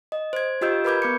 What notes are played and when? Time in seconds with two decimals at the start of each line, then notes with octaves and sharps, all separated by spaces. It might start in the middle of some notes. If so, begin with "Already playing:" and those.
0.12 D#5
0.33 C5 G#6
0.61 F4 G4 D#5 E6 G6 D7
0.85 A#4 B4 B5 D6 G6 G#6
1.02 B3 D6 C#7